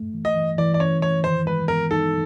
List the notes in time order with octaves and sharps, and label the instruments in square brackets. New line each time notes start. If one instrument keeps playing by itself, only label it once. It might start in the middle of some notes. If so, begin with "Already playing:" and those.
Already playing: [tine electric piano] A3
E3
[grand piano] D#5
[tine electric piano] E3
[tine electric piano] E3 [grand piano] D5
[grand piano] D5
[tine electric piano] C#4 [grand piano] C#5
[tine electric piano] E3 [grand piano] C#5
[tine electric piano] D#3 [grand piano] C5
[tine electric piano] G#3 [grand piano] B4
[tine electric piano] B3 [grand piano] A#4
[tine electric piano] D#4 [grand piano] A4